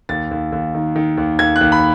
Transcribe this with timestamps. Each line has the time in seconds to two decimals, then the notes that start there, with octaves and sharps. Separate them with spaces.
0.09 D#2 A6
0.31 D#2
0.52 D#2
0.75 D#3
0.96 D#3
1.17 D#2
1.39 D#2 G#6
1.56 F#6
1.61 D#2
1.72 B5